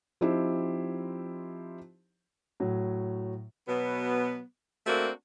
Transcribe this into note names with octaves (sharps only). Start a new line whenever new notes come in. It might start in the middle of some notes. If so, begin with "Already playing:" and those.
F3 C4 D#4 E4 G4 C5
A2 F#3
B2 F#3 B3
A3 A#3 C4 D4 F#4